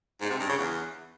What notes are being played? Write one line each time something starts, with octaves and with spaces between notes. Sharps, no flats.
G#2
C3
G2
C#3
E2